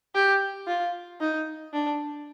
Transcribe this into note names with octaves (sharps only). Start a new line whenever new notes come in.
G4
F4
D#4
D4